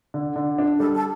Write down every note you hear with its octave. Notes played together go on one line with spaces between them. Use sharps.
D3
D3
D4
G3 A4
A4